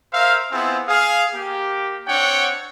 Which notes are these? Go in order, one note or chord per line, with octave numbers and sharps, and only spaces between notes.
A#4 C5 E5 F5
B3 C4 E4 F4 G#4
G#4 F5
A#3 G4
C4 D4 C#5 F#5 G5